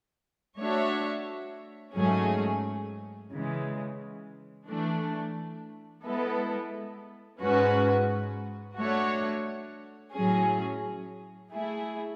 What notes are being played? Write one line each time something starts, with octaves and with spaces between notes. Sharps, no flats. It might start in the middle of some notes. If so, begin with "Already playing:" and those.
A3 D4 F#4 C#5 E5
G#2 F#3 A3 C#4 G#4
C#3 E3 G#3
E3 A3 D4
G#3 B3 E4 A4
G#2 G#3 C#4 F#4 B4
A3 D4 F#4 C#5
A2 F#3 C#4 G#4
A3 E4 G#4